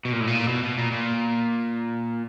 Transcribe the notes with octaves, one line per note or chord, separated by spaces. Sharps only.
B2
A#2
A2
A#2
B2
B2
A#2
A#2